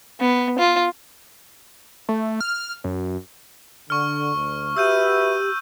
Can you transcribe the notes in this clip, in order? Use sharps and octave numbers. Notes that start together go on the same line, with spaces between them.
B3
F4
A3
F6
F#2
D3 C#6 F6
D2
F#4 G4 B4 E5 E6 G6 D#7